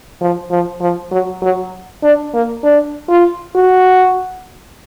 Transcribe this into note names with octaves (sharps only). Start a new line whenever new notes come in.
F3
F3
F3
F#3
F#3
D4
A#3
D4
F4
F#4